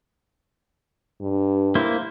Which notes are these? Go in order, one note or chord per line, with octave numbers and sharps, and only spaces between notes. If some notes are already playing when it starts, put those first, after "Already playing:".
G2
A#3 E4 C5